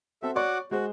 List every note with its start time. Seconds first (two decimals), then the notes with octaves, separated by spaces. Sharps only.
0.22 C4 F#4 A4 E5
0.36 F#4 C#5 D5 F#5 C#6 D6
0.71 G#3 F#4 G#4 C5